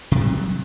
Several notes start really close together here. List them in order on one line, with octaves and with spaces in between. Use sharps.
C3 G3 F#3